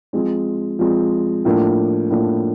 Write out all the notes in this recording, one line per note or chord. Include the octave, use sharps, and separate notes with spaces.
F3 G#3 C4
F3 G#3 C4
A2 F3 A#3 D4
A2 F3 A#3 D4